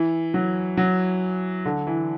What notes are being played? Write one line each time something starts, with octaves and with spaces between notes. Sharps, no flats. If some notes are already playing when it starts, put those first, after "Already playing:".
Already playing: E3
F#3
F#3
D3
E3